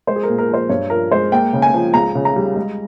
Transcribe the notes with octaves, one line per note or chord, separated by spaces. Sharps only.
G#3 C5
G#4
A#4
A#2
A#4
F3
C5
G2 C#5
F3 A#4
G#3 C5
A#3 G5
C#3
G#5
F3
C#2 A#5
C#3
A#5
G3
G#3